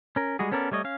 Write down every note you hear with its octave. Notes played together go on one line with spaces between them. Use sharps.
C#4 A#4
G3 G#3 F#4 G#4
B3 C#4 A4 A#4 D5
G3 A3 C#5 D#5
C#4 F5